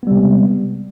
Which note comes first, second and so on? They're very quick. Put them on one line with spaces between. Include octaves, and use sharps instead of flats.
B3 G3 C3 G#3